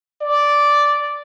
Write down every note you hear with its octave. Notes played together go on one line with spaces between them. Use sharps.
D5